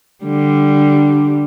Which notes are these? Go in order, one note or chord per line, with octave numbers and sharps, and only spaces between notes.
D3 G3